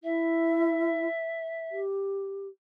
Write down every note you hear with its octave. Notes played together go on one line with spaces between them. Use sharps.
E4 E5
G4